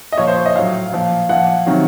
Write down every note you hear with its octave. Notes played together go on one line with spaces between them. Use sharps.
D#5
A#2 F3 C#5
C5
C#5
D#5
A2 F#3 F5
A#2 F3
A#2 F3 F#5
C3 D#3 F#3